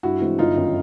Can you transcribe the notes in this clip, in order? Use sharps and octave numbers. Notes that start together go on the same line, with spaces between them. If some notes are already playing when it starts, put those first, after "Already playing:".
G2 E4 F#4
E3 G#3 C4
G1 D#4 F4
F#2 D#3